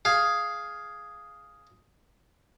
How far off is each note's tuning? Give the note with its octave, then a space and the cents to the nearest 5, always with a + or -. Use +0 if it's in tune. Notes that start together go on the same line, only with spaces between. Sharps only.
G#4 +0 F5 +0